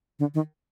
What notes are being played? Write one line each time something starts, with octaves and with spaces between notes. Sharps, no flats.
D3
D#3